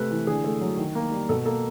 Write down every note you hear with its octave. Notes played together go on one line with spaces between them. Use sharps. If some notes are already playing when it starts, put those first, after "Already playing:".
Already playing: C3 A3 B4
E3
D3 G#4
A3
F#3
D#3
A#3
G3
B2 A4
A#3 A4